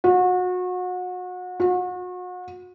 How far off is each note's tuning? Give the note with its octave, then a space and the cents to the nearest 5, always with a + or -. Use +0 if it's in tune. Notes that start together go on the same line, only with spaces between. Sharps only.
F#4 -30
F#4 -35